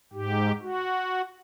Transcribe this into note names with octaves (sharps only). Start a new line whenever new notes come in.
G#2 G4
F#4